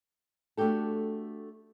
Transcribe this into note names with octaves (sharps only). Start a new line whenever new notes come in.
A3 D4 F#4 G4 A4